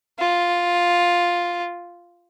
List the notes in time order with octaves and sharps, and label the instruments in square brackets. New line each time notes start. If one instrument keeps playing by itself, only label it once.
[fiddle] F4